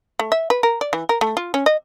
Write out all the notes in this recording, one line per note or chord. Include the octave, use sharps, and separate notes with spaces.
A3
E5
B4
A#4
D5
E3
A#4
A3
F4
C#4
D#5